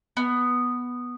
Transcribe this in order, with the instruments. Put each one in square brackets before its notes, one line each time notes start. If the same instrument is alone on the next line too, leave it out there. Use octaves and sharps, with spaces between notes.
[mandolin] B3